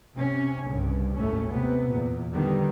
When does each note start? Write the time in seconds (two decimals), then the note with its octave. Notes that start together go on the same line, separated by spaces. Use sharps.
0.16 C3 C#4
0.68 C2 G2 C#3
1.14 G#1 D#2 A2 A3 C#4
1.50 C3 B3
1.90 E2 A#2
2.32 D3 D#3 G3 B3